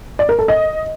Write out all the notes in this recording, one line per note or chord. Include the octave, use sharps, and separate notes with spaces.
D5
A#4
A4
D#5